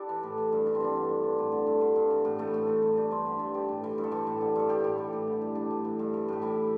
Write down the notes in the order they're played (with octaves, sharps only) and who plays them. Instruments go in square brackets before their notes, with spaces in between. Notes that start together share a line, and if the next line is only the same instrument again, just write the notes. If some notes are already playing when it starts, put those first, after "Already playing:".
Already playing: [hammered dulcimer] D4 E4 G4 A4
E3
A2
E3
G2
E3 D4
C4
G2 D4
D3
G2
E3
A2
D3
G2
D3 E4
G2
E3
A2
E3 A3
A2
E3
G2
E3 D4
G2 C5
D3 G4
G2 A4
E3 G4
A2
E3
G2
A4
E3 G4
A2
D3
G2 A4
E3 G4
A2 E4
E3 E4
A2
D3
G2
E3 D4
A2
E3
G2
E3
A2 G4
E3 E4